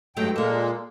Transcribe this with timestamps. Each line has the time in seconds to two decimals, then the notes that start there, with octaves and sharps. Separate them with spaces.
0.16 G2 F#3 G#3 A3 G5
0.36 A#2 G#3 A#3 A4 A#4